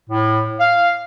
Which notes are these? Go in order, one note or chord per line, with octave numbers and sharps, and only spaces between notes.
A2
F5